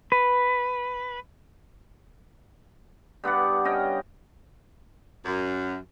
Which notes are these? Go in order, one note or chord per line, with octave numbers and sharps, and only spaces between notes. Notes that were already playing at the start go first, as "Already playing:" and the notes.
B4
G2 B3 D5 F#5
C#4 D#5 F5 G5
F#2